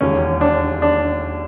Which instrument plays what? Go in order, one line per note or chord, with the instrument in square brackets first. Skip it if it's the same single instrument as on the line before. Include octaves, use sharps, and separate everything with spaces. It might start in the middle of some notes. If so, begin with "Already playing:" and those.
[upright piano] E1 D#2 C#3 [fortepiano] C#4
[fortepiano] D4
D4